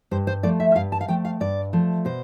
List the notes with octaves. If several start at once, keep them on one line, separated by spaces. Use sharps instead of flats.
G2 C5
C5
F3 A3 D5
E5
E5
G2 F5
A5
F5
F3 A3 G5
F5
G2 D5
F3 A3
B2 C5